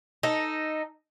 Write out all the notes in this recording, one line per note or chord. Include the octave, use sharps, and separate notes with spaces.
D#4 A4